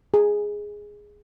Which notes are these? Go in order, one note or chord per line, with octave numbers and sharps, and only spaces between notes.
G#4